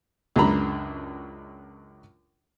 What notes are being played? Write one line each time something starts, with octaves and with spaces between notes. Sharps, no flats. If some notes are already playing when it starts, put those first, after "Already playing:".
C#2 F#2 G#3 D4 A#5 B5